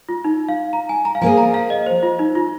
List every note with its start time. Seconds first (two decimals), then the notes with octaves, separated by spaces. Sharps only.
0.09 F4
0.24 D#4
0.49 F5
0.73 A#5
0.89 G#5
1.05 A#5
1.15 F5
1.21 F3 A#3 F4 G#4 G#5
1.38 A#5
1.54 F5
1.70 D#5
1.86 C5
2.03 F4
2.19 D#4
2.35 F4